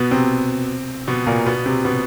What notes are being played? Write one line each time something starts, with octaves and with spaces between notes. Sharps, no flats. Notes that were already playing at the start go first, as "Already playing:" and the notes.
Already playing: B2 B3
C3 C4
B2 B3
A#2 A#3
B2 B3
C3 C4
B2 B3